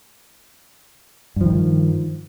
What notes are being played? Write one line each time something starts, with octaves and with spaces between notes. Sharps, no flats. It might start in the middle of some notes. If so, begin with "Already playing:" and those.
G2 D#3 F3